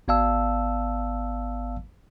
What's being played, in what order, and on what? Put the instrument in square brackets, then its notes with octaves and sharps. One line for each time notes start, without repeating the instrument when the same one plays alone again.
[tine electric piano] G#1 B3 D5 F5 A5 E6